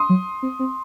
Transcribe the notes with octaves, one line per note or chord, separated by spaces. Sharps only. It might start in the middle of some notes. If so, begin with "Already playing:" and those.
Already playing: C6 D#6
F#3
C4
C4